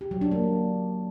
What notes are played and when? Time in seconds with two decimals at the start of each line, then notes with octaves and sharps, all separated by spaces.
0.01 G4
0.11 F#3
0.21 D4
0.31 A#3